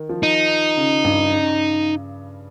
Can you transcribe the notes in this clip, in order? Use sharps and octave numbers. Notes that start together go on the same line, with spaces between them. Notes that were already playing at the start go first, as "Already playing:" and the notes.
Already playing: D#3
F3
D#4
C#3
G2
C#3